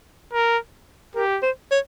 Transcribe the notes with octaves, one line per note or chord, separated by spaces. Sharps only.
A#4
G4 A#4
C5
C#5